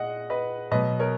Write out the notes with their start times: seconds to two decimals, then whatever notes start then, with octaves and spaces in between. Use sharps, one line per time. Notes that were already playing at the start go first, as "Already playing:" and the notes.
Already playing: A#2 G#3 D#5 F#5
0.30 B4 D#5
0.71 B2 F#3 B4 D#5
0.99 A#4 C#5